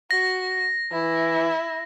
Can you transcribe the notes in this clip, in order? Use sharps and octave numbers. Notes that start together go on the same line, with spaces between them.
F#4 A#6
E3 E4